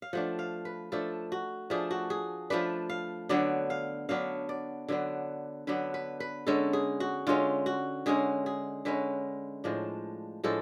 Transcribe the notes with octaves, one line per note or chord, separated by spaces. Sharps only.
F5
F3 A3 D4 F#5
F5
B4
F3 A3 D4 A4
F#4
F3 A3 D4 G#4
F#4
G#4
F3 A3 D4 B4
F5
D3 F#3 B3 D4 D5
F5
D3 F#3 B3 D4 F5
D5
D3 F#3 B3 D4
D3 F#3 B3 D4 B4
B4
B4
D3 G#3 C#4 A4
G#4
F#4
D3 G#3 C#4 F4
F#4
D3 G#3 C#4 G#4
G#4
D3 G#3 C#4 B4
A2 F3 G#3 D4
A2 F3 G#3 D4 A4